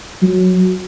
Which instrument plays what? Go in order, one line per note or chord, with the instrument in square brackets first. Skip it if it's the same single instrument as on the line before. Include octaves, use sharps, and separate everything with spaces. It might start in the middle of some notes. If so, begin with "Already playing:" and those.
[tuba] F#3